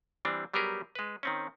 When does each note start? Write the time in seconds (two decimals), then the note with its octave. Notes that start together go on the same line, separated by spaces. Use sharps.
0.25 E3 G3 C4 D4
0.54 F#3 G3 B3 G4 G#4 A#4
0.95 G#3 B4
1.23 D#3 C4 C#4